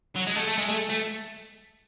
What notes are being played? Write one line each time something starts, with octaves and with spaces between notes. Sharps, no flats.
F#3
G#3
A3
A3
G#3
A3
A3